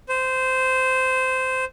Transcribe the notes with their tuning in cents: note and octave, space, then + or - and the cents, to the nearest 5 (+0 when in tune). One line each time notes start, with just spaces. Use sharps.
C5 -15